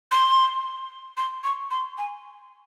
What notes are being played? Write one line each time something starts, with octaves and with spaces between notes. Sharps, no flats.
C6
C6
C#6
C6
G#5